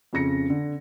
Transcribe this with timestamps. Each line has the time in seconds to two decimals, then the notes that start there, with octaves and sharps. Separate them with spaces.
0.13 F2 C#3 A#6 C#7
0.50 D3